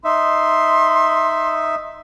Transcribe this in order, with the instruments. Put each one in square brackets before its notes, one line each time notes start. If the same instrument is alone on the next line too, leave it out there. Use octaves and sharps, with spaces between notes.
[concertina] D#4 E5 [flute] C6